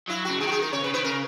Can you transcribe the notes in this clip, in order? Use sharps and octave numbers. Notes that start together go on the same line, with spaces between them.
F#3 E4
C#3 F#4
D#3 G#4
F#4
G#4
A#4
C#3 C#5
C#3 B4
D#3 B4
C#3 A#4